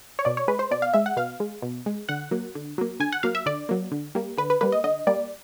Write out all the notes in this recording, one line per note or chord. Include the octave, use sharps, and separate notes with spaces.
C#5
B2 D5
C#5
G#3 B4
C5
B2 D5
F5
G#3 E5
F#5
B2 F5
G#3
B2
G#3
D3 F#5
F#3 A#3
D3
F#3 A#3
D3 G#5
F#5
F#3 A#3 F5
E5
D3 D5
F#3 A#3
D3
G3 A#3
D3 B4
B4
G3 A#3 B4
D#5
D3 D#5
G3 A#3 D5